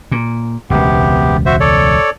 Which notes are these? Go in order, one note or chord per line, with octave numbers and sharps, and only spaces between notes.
A#2
E1 C#2 C3 B3 G4
F#4 C5 E5
A4 C#5 D5